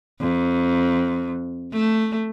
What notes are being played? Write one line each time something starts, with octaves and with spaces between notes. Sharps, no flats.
F2
A3